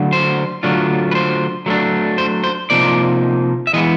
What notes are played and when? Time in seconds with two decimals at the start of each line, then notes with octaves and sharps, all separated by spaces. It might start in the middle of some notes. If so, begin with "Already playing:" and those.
Already playing: D3 F#3 A3
0.13 C5
0.63 D3 F#3 A3 D4 F4
1.11 B4
1.15 C5
1.66 F#3 A3 D4
2.18 C5
2.44 C5
2.70 C3 F3 A#3 D#4 D5
3.67 E5
3.74 E3 G#3 B3 D#5